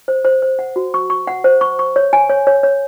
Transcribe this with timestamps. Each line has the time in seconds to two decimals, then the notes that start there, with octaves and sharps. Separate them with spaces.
0.08 C5
0.25 C5
0.42 C5
0.59 F#5
0.76 F#4
0.94 C#6
1.10 C#6
1.27 F#5
1.44 C5
1.61 C#6
1.79 C#6
1.96 C#5
2.13 G#5
2.30 C#5
2.47 C#5
2.63 C#5